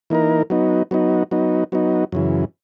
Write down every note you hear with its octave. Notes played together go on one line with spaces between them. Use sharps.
E3 A#3 D#4 A#4
F#3 B3 D#4
F#3 B3 D#4
F#3 B3 D#4
F#3 B3 D#4
F#2 C#3 E3